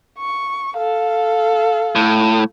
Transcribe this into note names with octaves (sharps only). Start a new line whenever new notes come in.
C#6
A4 F5
A2